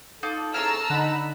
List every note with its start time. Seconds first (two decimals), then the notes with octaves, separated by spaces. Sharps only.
0.23 D#4 F4 A4 D5
0.54 E4 G#4 C#5 A5 A#5 E6 F6
0.90 D3 D#4 F#5 B5